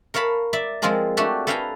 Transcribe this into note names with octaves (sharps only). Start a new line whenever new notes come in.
A#4 C#5 F5 A5 B5
D5 E5
F3 G#3 C4 F4 G#4 A#4
A3 D4 F#4 G4 A4
A4 B4 F5 G5 G#5 A#5